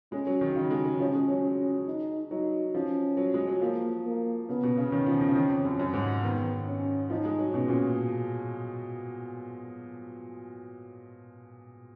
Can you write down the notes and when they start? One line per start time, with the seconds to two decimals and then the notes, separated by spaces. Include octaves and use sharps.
0.12 G#3 C#4
0.27 F#3
0.41 D#3
0.56 C#3 D#4
0.71 G#3
0.85 F#3
1.00 F3 C#4
1.14 G#3
1.29 F#3
1.43 C#4
1.87 D#4
2.30 F#3 D#4
2.74 F3 C#4
3.17 F#3
3.34 G#3
3.47 F#3
3.61 F3 A#3
4.05 A#3
4.48 C#3 B3
4.63 B2
4.77 C#3
4.92 D#3 C#4
5.06 F3
5.21 D#3
5.28 C#3
5.35 D#3
5.50 F2
5.65 F#2
5.79 F#2
5.93 G#2
6.22 D#3 B3
6.67 C#4
7.10 F3 D#4
7.25 G#3
7.39 F#3
7.54 B2 C#4
7.68 A#2